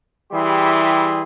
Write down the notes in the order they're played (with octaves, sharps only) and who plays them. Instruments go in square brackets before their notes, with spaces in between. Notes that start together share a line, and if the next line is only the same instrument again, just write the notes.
[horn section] E3 G3 E4 G4 G#4 C6